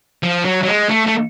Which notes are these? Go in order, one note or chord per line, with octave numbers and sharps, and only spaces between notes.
F3
F#3
F#3
G#3
A3
A3